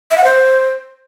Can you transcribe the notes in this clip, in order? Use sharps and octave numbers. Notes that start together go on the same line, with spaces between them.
E5
F#5
C5